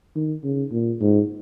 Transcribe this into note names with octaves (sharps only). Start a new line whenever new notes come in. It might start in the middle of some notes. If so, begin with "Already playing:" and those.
D#3
C#3
A#2
G#2